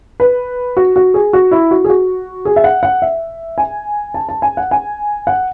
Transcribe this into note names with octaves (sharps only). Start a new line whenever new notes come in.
B4
F#4
F#4
G#4
F#4
E4
F#4
G#4
F#4
G#4
E5
F#5
F#5
E5
G#5
A5
A5
G#5
F#5
G#5
F#5